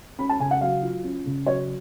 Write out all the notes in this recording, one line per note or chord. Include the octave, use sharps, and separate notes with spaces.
C#4 B5
A5
C#3 G#5
F#5
F#3 F5
F4
C#4
C#3
F#3 C#5